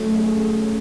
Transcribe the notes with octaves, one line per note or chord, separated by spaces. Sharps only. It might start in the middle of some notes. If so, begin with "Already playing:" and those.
Already playing: F#3 A3 C#4
C#4 G#4
C#3